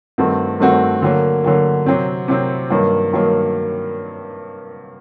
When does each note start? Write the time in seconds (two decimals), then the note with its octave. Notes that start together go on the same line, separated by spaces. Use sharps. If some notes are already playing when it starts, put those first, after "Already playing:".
0.18 G2 D#3 A3 C4 F#4
0.60 G2 D#3 A3 C4 F#4
1.02 D3 F#3 A#3
1.44 D3 F#3 A#3
1.86 C3 F#3 C4
2.28 C3 F#3 C4
2.70 G2 D#3 F#3 A#3
3.13 G2 D#3 F#3 A#3